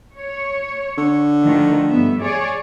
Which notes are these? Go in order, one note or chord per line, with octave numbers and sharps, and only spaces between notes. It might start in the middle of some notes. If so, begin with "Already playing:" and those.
C#5
D3
D#3 F3 A3
G2 B3 E5
G#4 C#5 D5